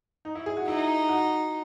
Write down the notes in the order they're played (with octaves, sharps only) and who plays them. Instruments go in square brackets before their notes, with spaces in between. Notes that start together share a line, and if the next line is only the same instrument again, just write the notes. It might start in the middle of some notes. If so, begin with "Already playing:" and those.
[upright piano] D#4
E4
G#4
F#4
[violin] D#4 [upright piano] E4
[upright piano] F#4